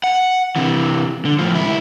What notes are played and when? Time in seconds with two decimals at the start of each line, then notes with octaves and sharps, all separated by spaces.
0.04 F#5
0.56 C3 E3
1.25 D3
1.39 A2 F3
1.54 C#2 E4